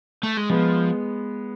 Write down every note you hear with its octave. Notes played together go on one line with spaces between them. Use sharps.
A3
G#3
F3 G#3 B3